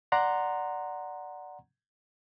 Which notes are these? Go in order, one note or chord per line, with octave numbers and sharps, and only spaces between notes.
D5 F#5 A#5 C6